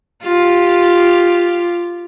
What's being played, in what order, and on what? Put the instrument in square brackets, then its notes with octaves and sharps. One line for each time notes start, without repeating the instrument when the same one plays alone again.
[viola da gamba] F4 G4